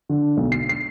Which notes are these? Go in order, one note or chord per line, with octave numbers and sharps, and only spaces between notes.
D3
B1
C7
C7